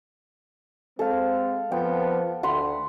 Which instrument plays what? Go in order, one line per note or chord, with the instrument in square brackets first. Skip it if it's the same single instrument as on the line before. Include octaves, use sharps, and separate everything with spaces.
[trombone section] G#3 C4 [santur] A4 F5
[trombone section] F2 F3 B3 [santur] G5
[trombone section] D2 [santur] F#5 B5 C6